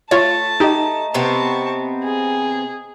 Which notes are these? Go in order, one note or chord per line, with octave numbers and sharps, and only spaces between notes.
A3 F4 C#5 A5 A6
D#4 G4 D#5 A#5
C3 B3 C4 A5 C#6
G#4